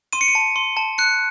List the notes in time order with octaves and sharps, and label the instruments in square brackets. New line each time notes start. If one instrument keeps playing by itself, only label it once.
[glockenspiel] C6 D#7
C#7
D#7
A5
C6
A5
F#6 C#7